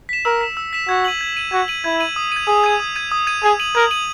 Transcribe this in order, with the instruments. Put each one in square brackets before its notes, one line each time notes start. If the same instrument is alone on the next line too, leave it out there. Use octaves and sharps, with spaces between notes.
[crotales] B6 E7
[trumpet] A#4 [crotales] E6
[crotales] B6 E7
E6
B6 E7
[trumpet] F#4 [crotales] G#6
[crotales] D#7 F#7
G#6
D#7 F#7
[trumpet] F#4 [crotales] G#6
[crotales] D#7 F#7
[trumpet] E4 [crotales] G#6
[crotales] D#7 F#7
D#6
G#6 D#7
[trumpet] G#4 [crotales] D#6
[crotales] G#6 D#7
D#6
G#6 D#7
D#6
G#6 D#7
[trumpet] G#4 [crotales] G#6
[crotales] D#7 F#7
[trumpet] A#4 [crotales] G#6
[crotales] D#7 F#7